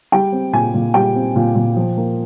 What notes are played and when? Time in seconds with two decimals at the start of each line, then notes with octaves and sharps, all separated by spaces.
0.12 G3 G5
0.32 C4
0.53 A#2 G#5
0.74 A#2
0.94 G3 G5
1.15 C4
1.36 A#2
1.56 A#2
1.76 F3
1.97 A#3